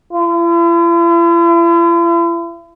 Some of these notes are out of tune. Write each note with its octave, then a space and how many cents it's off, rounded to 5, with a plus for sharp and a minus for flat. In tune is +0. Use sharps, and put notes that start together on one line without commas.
E4 +45